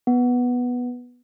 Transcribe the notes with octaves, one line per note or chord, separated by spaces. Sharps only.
B3